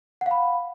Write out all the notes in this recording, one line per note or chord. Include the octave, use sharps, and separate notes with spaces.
F5 F#5 B5